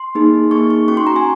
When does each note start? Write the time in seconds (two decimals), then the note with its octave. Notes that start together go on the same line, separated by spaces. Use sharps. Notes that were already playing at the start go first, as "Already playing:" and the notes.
Already playing: C6
0.15 A#3 D#4 G#4
0.51 A#3 D#4 G#4 C#6
0.70 C#6
0.88 C#4 F#4 C#6
0.97 C6
1.07 A#5
1.16 G#5